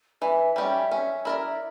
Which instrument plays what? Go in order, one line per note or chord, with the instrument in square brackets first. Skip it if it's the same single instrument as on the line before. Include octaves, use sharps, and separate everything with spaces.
[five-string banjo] E3 [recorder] E5
[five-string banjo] G3 C#4 G4 [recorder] E5
[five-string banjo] C#4
E4 A#4 D5